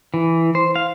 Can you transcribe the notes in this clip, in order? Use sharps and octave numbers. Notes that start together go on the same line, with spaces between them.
E3
C5
F5